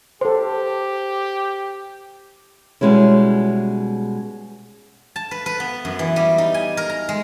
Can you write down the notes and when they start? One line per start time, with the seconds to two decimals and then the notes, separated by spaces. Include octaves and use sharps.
0.21 G4 A4 C5 C6
2.81 B2 G3 G#3 C#4 E4
5.16 A5
5.31 B4
5.46 B4
5.60 B3
5.85 F#2
5.99 E3
6.16 G3
6.38 D#4
6.54 G#5
6.77 A#4
6.89 A#5
7.09 G#3